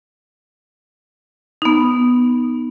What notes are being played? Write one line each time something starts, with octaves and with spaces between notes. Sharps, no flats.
B3 D#4